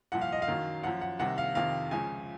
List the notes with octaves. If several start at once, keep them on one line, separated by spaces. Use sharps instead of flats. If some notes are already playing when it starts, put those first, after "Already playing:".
C2 A#2 F3 F#5
F5
D#5
F5
F#2 D#3 F#3
F#2 F3 F#5
F#5
C2 C3 D#3 F#5
F5
F2 C3 D#3 F5
C#2 C#3 F3 G#5